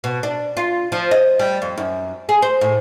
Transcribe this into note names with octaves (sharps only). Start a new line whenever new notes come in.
B2
D4
F4
F3
D#5
G3
F2
F#2
G#4
C5
A2